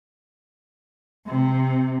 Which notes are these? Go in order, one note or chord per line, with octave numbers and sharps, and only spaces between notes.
C3